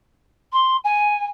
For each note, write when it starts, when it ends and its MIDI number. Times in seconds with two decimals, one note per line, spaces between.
0.52 0.76 84
0.84 1.26 80